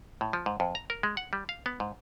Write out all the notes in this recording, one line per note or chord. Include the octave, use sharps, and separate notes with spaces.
A2
F3
G#2
F2
A#5
A#4
G#3
F#5
G3
F5
B3
G#2